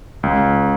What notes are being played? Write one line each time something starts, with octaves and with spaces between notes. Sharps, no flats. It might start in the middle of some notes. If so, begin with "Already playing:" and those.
C#2